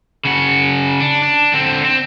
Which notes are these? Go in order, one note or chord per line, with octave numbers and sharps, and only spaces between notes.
C#3 F#4
D4
D4
D3 C4
C4